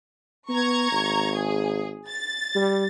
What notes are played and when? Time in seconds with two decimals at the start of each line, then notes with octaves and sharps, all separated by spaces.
0.49 B3 A#5 C#6 G#6
0.92 G#1
1.34 G#4
2.08 A6
2.55 G3